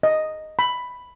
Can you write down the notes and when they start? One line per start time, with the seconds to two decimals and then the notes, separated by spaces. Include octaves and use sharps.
0.03 D#5
0.59 B5